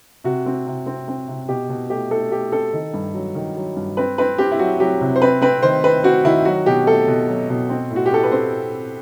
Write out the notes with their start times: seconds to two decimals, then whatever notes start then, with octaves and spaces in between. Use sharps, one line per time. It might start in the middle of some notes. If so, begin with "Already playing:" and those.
0.24 C3 F#4
0.46 C4
0.66 C3
0.86 C4
1.08 C4
1.28 C3
1.49 B2 G4
1.69 B2
1.90 A3 G4
2.11 A3 A4
2.31 A3 G4
2.52 C4 A4
2.73 D#3
2.94 G2
3.14 F#3
3.35 D#3
3.56 F#3
3.76 G2
3.97 C4 B4
4.18 C4 B4
4.38 C4 G4
4.51 E4
4.59 F#3 F#4
4.80 F#3 G4
5.01 C3
5.16 C5
5.22 C4 B4
5.42 C4 B4
5.62 D#3 C5
5.84 C4 B4
6.04 C4 F#4
6.25 D#3 E4
6.45 F#3 F#4
6.66 B2 G4
6.87 A3 A4
7.07 B2
7.28 F#3
7.49 B2
7.69 C4
7.91 A2
7.96 F#4
8.06 G4
8.11 C4 A4
8.23 B4
8.32 C4 C5